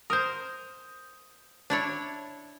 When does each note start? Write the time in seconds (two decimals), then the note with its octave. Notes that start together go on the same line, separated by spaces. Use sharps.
0.10 A#4 C5 D#6 G6
1.70 D4 E4 C#5